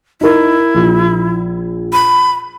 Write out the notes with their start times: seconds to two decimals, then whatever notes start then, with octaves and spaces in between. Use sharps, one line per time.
0.21 D#4 E4 A#4
0.75 A#1 A#2
1.93 B5